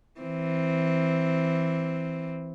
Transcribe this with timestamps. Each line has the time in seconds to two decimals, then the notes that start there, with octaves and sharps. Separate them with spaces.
0.21 E3 C4